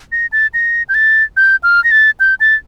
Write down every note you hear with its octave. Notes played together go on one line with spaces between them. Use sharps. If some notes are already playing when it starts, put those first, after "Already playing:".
A#6
A6
A#6
G6
A6
G6
F6
A#6
A6
G6
A6